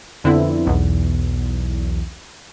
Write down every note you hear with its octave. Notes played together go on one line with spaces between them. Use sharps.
F2 D3 B3 C4 E4
B1 E2